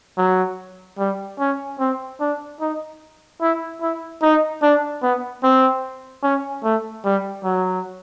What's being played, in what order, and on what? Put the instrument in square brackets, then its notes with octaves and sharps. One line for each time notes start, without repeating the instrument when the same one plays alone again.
[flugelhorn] F#3
G3
C#4
C4
D4
D#4
E4
E4
D#4
D4
B3
C4
C#4
A3
G3
F#3